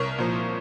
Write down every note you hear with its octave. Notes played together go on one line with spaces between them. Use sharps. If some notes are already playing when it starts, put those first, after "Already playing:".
Already playing: C2 A#4 C#5
A#2 F3